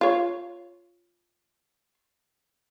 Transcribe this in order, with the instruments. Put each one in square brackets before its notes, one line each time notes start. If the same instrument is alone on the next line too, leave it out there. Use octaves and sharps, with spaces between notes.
[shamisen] F4 C#5